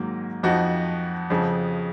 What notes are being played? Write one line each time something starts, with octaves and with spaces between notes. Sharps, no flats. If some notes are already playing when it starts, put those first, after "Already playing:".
Already playing: G#2 D#3 F#3 A#3
F2 F3 D#4 F#4
F2 C#3 F3